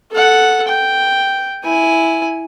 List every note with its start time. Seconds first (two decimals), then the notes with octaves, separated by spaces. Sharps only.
0.12 A4 F#5
0.68 G5
1.65 E4 G#5